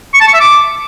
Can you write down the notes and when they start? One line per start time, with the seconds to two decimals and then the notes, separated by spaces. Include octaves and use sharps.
0.14 C#6
0.20 A5
0.27 C#6
0.34 E5
0.40 D6